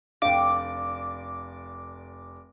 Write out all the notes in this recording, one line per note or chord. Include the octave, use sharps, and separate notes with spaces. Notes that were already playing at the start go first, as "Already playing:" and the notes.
F1 D4 A4 D5 F5 G5 D6